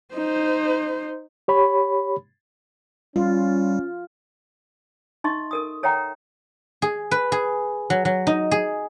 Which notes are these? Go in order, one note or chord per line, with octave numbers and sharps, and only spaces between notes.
D#4 C5
G4 C#5 B5
G3 C#4 F4
D#4 D#5 E5 C6 C#6
A4 A#4 D#6
A4 C#5 E5 F#5 G5 A#5
G#4
B4
G#4
F#3
F#3
D#4
G#4